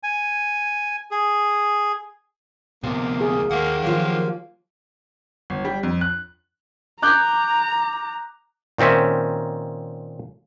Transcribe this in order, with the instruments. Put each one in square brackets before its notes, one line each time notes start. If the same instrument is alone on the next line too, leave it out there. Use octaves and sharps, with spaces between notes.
[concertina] G#5
G#4
[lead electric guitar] D2 B3 [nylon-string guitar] C3 [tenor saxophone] A#3
[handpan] G#4
[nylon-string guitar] D#2 [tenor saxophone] A#3 [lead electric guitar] G4 F#5
[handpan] D#3 F4 [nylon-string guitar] F3 F#3 [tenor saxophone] A#3
[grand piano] G1
G3
F2
F#6
[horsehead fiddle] A#5 [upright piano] D6 F#6 G6
[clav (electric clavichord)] A#2 D#3 C4 C#4 E5